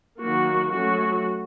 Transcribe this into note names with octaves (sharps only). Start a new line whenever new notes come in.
D#3 F#3 A#3 F#4
F#3 A3 C#4 F#4